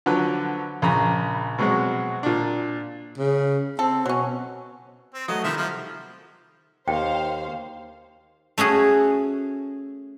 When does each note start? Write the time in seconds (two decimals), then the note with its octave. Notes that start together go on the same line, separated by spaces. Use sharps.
0.06 D3 F3 F#3 B4
0.82 A#1 C#3 A#5 B5
1.58 B2 F#3 G#3 C4 F#4
2.23 A#2 D4
3.18 C#3
3.79 C4 A4
4.06 B2 F#3 C#4
5.14 C4
5.28 F#3 A3 D#5
5.44 C3 D#3 F3 G3 E5
5.57 F3 A#3
6.88 D#2 C5 F5 G5
8.58 A3 C#4 F#4 G#4